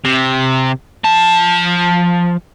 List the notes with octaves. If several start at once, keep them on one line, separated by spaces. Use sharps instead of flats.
C3
F3 A5